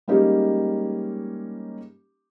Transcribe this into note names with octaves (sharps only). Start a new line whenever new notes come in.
G3 G#3 A#3 C#4 D#4 G4